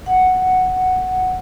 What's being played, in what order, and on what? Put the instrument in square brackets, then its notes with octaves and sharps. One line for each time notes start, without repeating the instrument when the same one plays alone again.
[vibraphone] F#5